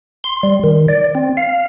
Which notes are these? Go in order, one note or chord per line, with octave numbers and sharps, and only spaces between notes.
C6
G3
D#3
D5
C4
F5